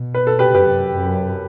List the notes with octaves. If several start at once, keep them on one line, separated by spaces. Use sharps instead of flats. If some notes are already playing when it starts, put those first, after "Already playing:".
Already playing: B2
B4
A4
G4 B4
F#2 G4 B4
F#2